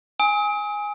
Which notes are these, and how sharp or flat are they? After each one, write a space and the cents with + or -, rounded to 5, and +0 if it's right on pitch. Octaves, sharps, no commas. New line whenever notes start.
G#5 -5 D#6 +40